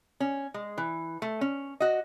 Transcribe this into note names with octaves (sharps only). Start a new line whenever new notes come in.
C#4
G#3
E3
A3
C#4
F#4 D#5